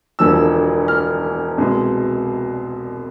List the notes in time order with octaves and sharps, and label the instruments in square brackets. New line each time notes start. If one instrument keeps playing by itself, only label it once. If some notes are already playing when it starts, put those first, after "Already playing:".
[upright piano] E1 E2 D3 F3 E6
F6
C2 B2 G#3